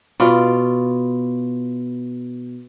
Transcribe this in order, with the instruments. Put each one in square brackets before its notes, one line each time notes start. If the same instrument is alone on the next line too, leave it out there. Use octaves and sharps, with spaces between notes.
[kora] B2 F4 D5